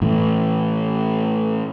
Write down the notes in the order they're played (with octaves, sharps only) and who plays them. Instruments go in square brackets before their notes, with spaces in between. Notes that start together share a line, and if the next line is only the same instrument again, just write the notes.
[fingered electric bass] A2 E3